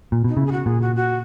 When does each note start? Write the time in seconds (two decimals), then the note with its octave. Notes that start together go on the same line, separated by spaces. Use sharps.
0.12 A#2
0.24 B2 D#4
0.37 C#3 E4
0.46 G#4
0.52 F#4
0.66 A#2 G#4
0.81 F#4
0.96 F#4